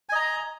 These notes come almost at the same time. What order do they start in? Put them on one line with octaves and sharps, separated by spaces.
G#5 D#5 A#5